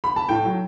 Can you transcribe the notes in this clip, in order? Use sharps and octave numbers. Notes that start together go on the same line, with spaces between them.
B5
A5
A2 G5
F#3